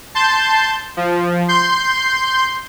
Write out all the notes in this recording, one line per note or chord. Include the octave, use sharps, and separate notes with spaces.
A5 C6 G6
F3
C6 G6